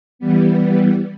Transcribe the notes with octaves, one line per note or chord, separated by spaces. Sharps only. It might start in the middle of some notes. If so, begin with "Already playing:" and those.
E3 G3 B3